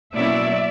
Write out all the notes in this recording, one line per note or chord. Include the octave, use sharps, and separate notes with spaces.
B2 F#3 A#3 C#4 E4 D5 E5